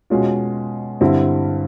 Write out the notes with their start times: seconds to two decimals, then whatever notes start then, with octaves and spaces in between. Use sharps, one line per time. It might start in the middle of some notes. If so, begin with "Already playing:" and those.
0.10 B2 G#3 C#4 F4
1.01 G2 D3 G3 C4 E4